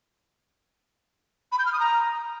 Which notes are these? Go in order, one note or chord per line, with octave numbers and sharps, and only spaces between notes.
B5
G6
F6
D#6
A#5